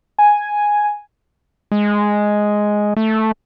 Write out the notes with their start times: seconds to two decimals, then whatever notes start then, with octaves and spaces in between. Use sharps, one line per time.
0.19 G#5
1.72 G#3
2.97 A3